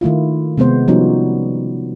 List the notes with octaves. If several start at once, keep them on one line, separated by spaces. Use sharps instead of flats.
D#3 A3 E4 F4
C3 G#3 B3 C5
F3 G3 B3 C#4 D#4 F#4